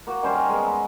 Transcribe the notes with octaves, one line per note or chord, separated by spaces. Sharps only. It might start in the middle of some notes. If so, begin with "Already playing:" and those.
A#3 F#4
D#3 G3 C#4 C5
A#4
G#3 B3
E5 A#5